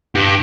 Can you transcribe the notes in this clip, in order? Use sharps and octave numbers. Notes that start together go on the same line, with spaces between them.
G2